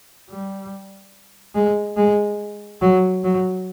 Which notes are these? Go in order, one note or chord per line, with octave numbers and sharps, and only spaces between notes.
G3
G#3
G#3
F#3
F#3